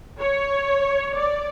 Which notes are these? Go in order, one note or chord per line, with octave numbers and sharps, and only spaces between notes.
C#5
D5